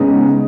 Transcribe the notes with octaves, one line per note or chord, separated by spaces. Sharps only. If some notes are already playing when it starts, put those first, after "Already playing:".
Already playing: C#3 G#3 B3 D#4